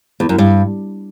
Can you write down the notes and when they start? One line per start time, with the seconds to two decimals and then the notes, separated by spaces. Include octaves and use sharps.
0.20 E2
0.29 F#2
0.38 G2